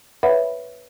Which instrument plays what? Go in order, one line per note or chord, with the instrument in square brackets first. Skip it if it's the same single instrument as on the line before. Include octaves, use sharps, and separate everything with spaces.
[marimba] B4 C#5 E5 F#5 B5